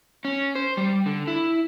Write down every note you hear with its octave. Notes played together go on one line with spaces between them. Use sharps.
C#4
C5
G3
D3
E4